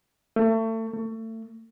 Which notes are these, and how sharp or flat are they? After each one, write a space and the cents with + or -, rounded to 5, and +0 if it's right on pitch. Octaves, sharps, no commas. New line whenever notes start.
A3 +30
A3 +30